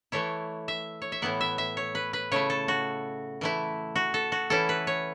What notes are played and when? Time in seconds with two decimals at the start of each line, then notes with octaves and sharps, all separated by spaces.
0.12 E3 A3 E4 C#5
0.68 E5
1.02 C#5
1.12 E5
1.22 A2 E3 B3 E4 F#5
1.41 E5
1.58 E5
1.77 C#5
1.95 B4
2.13 B4
2.31 C#3 A3 E4 C#5
2.50 A4
2.68 F#4
3.41 E3 A3 E4
3.96 F#4
4.14 A4
4.32 F#4
4.50 E3 C#4 E4 A4
4.69 B4
4.87 C#5